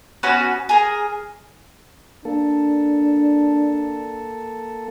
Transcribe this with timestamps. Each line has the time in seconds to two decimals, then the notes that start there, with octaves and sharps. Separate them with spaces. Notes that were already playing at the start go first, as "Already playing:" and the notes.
0.23 B3 C#4 F#4 B4
0.69 G#4 A#4
2.25 A#3 D4 A4